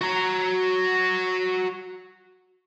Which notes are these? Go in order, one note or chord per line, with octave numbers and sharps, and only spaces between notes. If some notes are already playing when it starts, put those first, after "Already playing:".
F#4 A#5